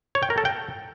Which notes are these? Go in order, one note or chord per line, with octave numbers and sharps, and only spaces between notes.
C#5
G5
A#4
A4
G5